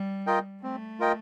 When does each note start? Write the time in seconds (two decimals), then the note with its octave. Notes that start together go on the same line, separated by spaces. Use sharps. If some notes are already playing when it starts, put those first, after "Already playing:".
Already playing: G3
0.27 F4 A#4 D#5 G5
0.63 A3 C4
1.00 F4 A#4 D#5 G5